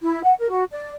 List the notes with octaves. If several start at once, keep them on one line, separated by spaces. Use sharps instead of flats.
E4
F#5
A#4
F#4
D5